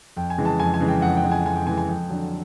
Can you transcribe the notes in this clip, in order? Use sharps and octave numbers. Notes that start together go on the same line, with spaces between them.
F2 G5
G#5
C#3 E3 G#3
A5
F2 G#5
G#5
C#3 E3 G#3
G5
F2 F#5
G5
C#3 E3 G#3
G#5
F2 G#5
G5
C#3 E3 G#3 G#5
G#5
F2 G5
D3 F#3